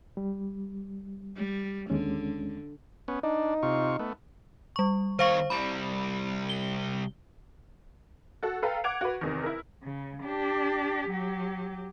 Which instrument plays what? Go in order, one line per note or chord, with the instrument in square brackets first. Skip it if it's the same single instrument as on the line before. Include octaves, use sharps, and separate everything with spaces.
[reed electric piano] G3
[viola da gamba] G3
[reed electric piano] D#2 G#3 C#4 [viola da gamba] D3
[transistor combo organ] B3 C#4
[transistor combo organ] D4 [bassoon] D#4
[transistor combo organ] C3 F4 C#6
A3 B3
[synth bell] G3 C#6
[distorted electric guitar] D#3 C#5 [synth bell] C5 F5 C#6
[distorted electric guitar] C2 G3 [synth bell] B5
[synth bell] G7
[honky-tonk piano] F#4 A4 F#5
A4 B4 F5 G5 A#5
F#5 D6 G#6 D7 F7
F#4 B4
E2 C3 D#3
E4 A#4
[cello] C#3
D4 G4
F#3 G4